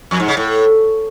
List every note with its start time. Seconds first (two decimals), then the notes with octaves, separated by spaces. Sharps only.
0.11 F2
0.20 G#2
0.28 C#3
0.37 A2